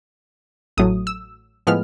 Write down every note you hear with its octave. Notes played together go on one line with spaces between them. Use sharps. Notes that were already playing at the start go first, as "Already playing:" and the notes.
A1 A2 F#3 A3 D#6
E6
A2 F3 G#3 B3 F6